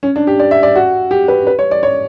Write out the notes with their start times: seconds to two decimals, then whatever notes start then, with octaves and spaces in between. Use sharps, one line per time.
0.03 C#4
0.16 D4
0.27 G4
0.40 D5
0.51 E5
0.63 D5
0.76 F#4
1.11 G4
1.28 B4
1.47 B4
1.59 C#5
1.71 D5
1.83 C#5